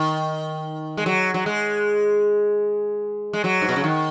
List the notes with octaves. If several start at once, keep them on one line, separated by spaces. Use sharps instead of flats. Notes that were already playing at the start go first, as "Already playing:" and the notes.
Already playing: D#3
G#3
F#3
F#3
G#3
G#3
F#3
G#2
B2
C#3
D#3